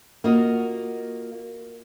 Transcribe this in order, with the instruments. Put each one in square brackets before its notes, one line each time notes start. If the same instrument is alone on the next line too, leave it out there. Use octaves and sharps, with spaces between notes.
[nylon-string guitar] A#3 F4 F#4 D#5